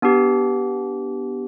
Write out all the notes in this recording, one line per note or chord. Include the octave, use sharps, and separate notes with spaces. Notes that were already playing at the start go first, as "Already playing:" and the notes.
B3 D4 G4